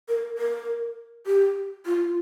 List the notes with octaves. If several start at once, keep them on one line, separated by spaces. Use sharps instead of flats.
A#4
A#4
G4
F4